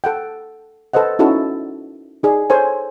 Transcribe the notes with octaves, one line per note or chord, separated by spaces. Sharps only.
A4 F#5 G5
A4 B4 C5 D#5 F#5
C#4 D#4 E4 F#4 A4
D#4 G#4 D5
A4 C5 C#5 G#5